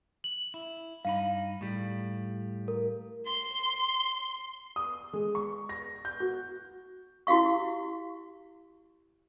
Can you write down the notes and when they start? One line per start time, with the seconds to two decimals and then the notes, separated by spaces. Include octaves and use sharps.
0.24 F#7
0.54 E4
1.05 G2 D#4 F5 B5
1.61 A2 G3
2.68 A#4
3.26 C6
4.76 D#6
5.13 G#3
5.35 C#6
5.69 A#6
6.05 G6
6.20 F#4
7.27 E4 F#4 G4 F5 C#6